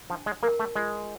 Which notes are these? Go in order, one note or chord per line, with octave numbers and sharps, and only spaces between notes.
F3 D4
G#3
A#3 A#4
A3
G#3 F4